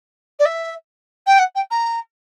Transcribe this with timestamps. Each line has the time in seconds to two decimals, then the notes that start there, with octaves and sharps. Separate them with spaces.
0.39 D5
0.45 E5
1.26 G5
1.38 F#5
1.55 G5
1.70 A#5